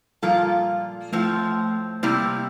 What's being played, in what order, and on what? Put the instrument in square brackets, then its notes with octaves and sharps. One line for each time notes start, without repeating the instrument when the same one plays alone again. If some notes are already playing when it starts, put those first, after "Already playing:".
[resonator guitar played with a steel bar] A#2 F3 A#3 F4 A4 [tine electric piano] G3
[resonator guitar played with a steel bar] A2 F3 C4 [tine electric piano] A3
[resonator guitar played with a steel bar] C3 G3 C4 E4 [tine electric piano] A#3